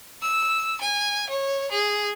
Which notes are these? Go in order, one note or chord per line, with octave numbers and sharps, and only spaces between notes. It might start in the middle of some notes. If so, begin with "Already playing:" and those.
E6
G#5
C#5
G#4